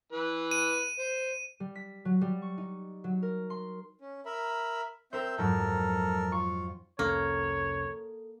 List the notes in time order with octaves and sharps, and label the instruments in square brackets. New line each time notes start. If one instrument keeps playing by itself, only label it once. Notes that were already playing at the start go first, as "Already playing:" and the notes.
[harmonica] E3 B4
[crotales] D#7
[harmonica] C5
[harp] G3
B6
F#3
G3
C#6
D#4
F#3
A#4
C6
[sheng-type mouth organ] C#4
A#4 E5 B5
[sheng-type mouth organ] C4 E5 G6 [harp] A#4 C5
[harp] F2 G#2 F#3 [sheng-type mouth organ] A4 A#4
[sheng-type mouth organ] F4 [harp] C#6
[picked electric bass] C2 F2 C#4 [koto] A#3 [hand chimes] A4 [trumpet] C#5